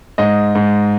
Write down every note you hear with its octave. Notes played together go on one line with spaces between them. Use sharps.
G#2 D#5
G#2